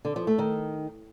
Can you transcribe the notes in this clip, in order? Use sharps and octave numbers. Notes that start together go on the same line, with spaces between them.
D3
F3
A3
D#3